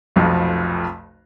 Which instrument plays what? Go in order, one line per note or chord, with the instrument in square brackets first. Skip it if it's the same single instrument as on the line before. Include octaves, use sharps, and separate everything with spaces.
[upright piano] F1 B1 F2 F3